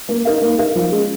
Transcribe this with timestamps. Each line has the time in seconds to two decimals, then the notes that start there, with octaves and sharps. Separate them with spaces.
0.09 A#3
0.25 D#4 A#4 F5
0.41 A#3
0.59 D#4 A#4 F5
0.75 F3
0.91 G#3 C#4